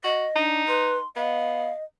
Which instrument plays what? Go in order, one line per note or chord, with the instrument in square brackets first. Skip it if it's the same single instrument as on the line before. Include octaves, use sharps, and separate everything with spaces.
[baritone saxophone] F#4 [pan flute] D#5
[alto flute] D4 [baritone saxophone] D#4
[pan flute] B4 [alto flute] C6
[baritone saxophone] B3 [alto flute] D#5 [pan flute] F5